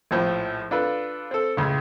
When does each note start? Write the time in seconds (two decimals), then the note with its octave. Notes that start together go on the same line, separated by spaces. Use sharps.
0.11 A#1 A2 F3
0.71 D4 F4 A4 B4
1.31 C4 A4
1.57 C#2 A2 C#3